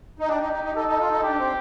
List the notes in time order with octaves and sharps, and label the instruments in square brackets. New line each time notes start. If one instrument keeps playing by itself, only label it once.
[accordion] D#4
[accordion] D4 [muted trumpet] G4
[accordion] D#4
D#4
D#4
[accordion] D#4 [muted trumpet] A4
[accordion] D#4
F4
D#4
[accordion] D4 [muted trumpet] G4
[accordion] C4